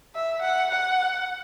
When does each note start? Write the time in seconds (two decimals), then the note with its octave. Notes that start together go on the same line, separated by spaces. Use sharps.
0.15 E5
0.42 F#5
0.71 F#5